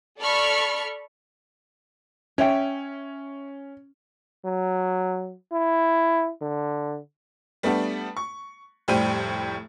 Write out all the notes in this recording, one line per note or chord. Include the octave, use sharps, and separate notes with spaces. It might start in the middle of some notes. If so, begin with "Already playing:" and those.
A4 D5 A5 B5 C#6 F6
C#4 C#5 E5 G5
F#3
E4
D3
G3 A3 B3 D4
C#6
F1 A2 G3 C5 G5 D#7